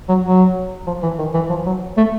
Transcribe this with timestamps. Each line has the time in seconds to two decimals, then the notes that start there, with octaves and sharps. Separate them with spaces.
0.09 F#3
0.24 F#3
0.87 F3
1.03 E3
1.18 D#3
1.34 E3
1.50 F3
1.66 F#3
1.97 A3